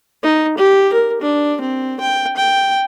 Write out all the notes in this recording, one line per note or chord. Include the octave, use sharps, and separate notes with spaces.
D#4
G4
A#4
D4
C4
G5
G5